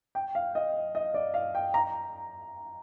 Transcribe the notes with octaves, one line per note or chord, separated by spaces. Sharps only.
G5
F5
D#5
D#5
D5
F5
G5
A#5